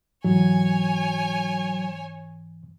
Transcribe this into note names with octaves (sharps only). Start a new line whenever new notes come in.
G#2 E3 F#3 C#5 G#5